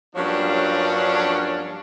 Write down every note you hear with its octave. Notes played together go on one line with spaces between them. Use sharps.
G2 F3 F#3 A#3 C#4 D4